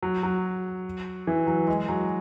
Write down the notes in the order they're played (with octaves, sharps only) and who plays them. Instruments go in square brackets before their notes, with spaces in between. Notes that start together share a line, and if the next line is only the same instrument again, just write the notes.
[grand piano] F#3
F#3
E3
F#3
G#3
F#3